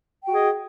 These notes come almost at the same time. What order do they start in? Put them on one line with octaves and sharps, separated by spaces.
G5 F#4 G#4 D#5